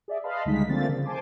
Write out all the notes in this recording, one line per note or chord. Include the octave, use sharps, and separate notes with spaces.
G#4 D5 E5
B4 D#5 F5 A5 B5 C6
C#2 D3 G3 G#3 D#4 B6
D3 F3 A3 A#3 C4 A6
C#3
C5 G#5 A5 C6 D6